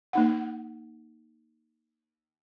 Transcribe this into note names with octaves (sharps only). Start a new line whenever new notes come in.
A#3 D#4 F#5